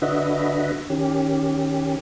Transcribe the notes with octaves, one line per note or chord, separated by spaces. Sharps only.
D3 D4 F#4 B4 D#5 E5
D#3 C#4 G4